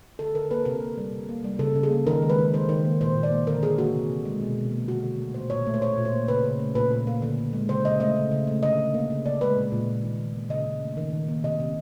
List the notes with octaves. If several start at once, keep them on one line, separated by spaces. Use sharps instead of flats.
D3 A4
D3 A#4
A#3 B4
C3 A#4
A#3
G3
C3
A#3
G3
C#3 A4
C#3
G#4
A#3
D#3 A#4
G#3
B4
D#3
D#3 C5
D#3
A#3
A#2 C5
A#2
D5
A#3
D3 A#4
D3 G#4
A#3 F#4
C3
C3
G#3
B2
B2
A#3
D3 F#4
D3
A3
A#2 C5
A#2 C#5
A3
C5
A#2 C#5
A#2
C5
A#3
C#3 B4
C#3
A3
A#2 B4
A#2
A#3
D3
D3
G#3
C#3 C5
C#3 D#5
A3 D#5
C#3
C#3
A3
D3 D#5
D3
A#3
C#3
C#3 D5
G#3 B4
A#2
A#2
A#3
D#3
D#3
A#3
C#3 D#5
C#3
A3
D#3
D#3
A#3
C3 D#5
C3